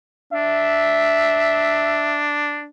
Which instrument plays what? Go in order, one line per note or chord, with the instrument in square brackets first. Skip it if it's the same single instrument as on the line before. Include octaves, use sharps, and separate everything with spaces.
[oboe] D4 [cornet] E5